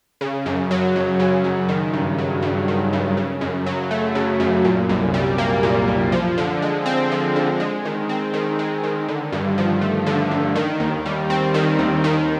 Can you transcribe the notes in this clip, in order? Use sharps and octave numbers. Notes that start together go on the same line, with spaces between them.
C#3
F#2
F#3
F#2
C#3
F#2
D#3
G2
F#3
G2
D#3
G2
C#3
F#2
F#3
A3
C#3
F#2
A#2
C2
G3
A#3
A#2
C2
F3
D3
G#3
C4
F3
D3
G#3
D#3
C4
D#3
G#3
D#3
D3
G2
F3
A3
D3
G2
D#3
D#2
G3
C4
D#3
D#2
D#3